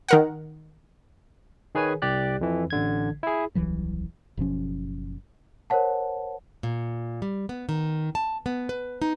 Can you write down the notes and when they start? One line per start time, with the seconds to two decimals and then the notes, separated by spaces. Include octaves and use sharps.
0.09 D#3 A#4 F#5
1.75 D#3 G#4 B4 C#5 G#5
2.02 C2 G4 D5 F#6
2.41 F2 E3
2.70 A1 D3 G#6
3.23 E4 G#4
3.55 D#1 C2 E3 F#3
4.37 F#1 B2 F3 C#4
5.70 A#4 C5 C#5 F#5 A5
6.63 A#2
7.22 G3
7.49 B3
7.69 D#3
8.15 A5
8.46 B3
8.69 B4
9.02 D#4